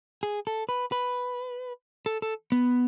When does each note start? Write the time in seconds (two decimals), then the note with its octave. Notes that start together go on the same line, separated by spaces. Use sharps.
0.23 G#4
0.47 A4
0.69 B4
0.92 B4
2.06 A4
2.22 A4
2.52 B3